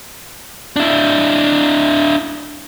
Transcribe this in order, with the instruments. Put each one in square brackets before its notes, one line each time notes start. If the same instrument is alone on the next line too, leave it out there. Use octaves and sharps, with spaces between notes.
[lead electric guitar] D4 E4